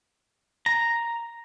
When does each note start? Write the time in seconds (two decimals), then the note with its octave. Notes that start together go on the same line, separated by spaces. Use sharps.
0.66 A#5